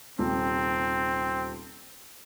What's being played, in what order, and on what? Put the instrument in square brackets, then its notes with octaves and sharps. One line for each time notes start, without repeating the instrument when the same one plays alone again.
[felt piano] D#1 C3 [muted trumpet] C4